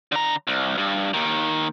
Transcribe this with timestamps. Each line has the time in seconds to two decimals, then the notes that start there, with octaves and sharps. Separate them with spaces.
0.12 D3 A#5
0.47 C2
0.78 G2
1.14 D#2 D#3